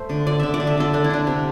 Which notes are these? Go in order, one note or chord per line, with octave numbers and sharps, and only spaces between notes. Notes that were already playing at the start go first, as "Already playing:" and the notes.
Already playing: A3 C5 E5
D3
D3 D5
D3 E5
D5
D3
E5
D3 A4 D5
D3 D4
E4
D3 D4
C3